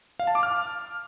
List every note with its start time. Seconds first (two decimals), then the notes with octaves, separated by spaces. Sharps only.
0.20 F5
0.27 A5
0.35 D6
0.43 F6